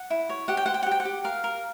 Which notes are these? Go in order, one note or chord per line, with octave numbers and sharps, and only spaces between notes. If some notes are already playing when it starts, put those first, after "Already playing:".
Already playing: F#5
E4
C#5
G4 F#5
G5
C5 F#5
G5
F#5
G4
G5
F#5
G4
A#4 F5
A#4